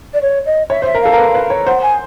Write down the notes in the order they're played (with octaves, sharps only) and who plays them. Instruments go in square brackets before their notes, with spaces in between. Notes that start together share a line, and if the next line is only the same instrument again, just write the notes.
[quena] D5
C#5
D#5
[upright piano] C#5 [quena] E5
[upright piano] C5
[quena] E5
[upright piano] A#4
[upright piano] A4 [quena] F5
[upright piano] A#4
B4
B4
C#5
[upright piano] C5 [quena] F#5
[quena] G#5